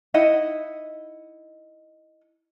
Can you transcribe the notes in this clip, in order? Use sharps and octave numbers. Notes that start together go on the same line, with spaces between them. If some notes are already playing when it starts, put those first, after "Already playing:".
D#4 E4 D#5 F#5